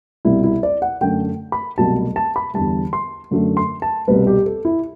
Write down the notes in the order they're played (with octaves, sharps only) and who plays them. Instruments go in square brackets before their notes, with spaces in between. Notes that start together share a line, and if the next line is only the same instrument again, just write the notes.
[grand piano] C2 B2 G3 E4
E4
D5
F#5
F#2 D3 A3 G5
B5
C2 B2 F#3 A3 A5
A5
B5
E2 D3 G3 A5
C6
F#2 D3 F#3 A3
C6
A5
C2 B2 G3 B4
G4
A4
E4